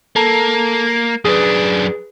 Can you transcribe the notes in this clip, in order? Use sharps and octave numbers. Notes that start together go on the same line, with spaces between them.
A#3 A4 A5 A#5
F#2 D4 G#4 B4